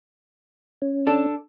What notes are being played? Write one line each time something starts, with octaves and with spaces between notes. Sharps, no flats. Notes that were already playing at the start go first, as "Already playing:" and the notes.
C#4
D4 A4